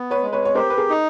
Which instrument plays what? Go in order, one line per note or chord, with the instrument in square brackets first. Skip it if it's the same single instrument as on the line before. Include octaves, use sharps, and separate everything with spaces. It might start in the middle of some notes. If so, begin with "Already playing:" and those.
Already playing: [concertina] B3
[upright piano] B4 C#5
[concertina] G#3
[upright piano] B4 C#5
C#5
[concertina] G4 [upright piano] A#4 C5
[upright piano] B4
G#4 A#4
[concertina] D#4